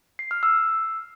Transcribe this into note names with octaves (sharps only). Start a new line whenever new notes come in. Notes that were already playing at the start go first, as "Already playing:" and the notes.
C7
F6
E6